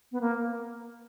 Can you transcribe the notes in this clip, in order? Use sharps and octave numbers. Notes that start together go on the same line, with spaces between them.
B3
A#3